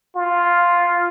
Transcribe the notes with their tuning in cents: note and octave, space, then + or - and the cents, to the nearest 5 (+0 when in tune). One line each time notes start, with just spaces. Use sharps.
F4 +0